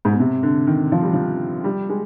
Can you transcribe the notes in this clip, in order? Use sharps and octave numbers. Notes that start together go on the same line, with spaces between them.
G#2
B2
C3
D3
D#3
F3
G3
F3
G3
G#3